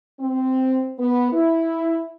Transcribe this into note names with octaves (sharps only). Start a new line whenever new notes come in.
C4
B3
E4